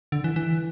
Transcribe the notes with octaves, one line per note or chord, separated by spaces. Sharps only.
D3
E3
E3